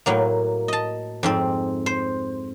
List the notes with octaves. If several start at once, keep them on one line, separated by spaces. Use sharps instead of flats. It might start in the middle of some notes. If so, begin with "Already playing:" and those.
A2 F#3 A#3
D#5 A5
F2 G#2 C4
C5